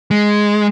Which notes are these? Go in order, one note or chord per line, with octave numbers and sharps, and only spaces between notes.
G#3